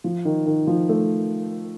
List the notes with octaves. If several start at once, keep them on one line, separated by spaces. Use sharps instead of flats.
F3
D#3
D#3
F3
A3